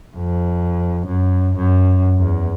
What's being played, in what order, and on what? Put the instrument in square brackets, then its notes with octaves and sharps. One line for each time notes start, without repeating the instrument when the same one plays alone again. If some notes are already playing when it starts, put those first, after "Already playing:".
[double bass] F2
F#2
F#2
E2